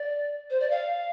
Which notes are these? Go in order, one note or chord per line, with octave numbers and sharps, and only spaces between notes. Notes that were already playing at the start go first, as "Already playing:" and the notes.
Already playing: D5
C5
D5
F5